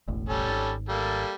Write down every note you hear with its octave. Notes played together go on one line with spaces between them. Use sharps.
E1 A1 A2
G3 C#4 A4
G#1
G3 A#3 A4